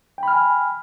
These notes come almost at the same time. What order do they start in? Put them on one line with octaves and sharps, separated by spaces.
G5 B5 F6 G#5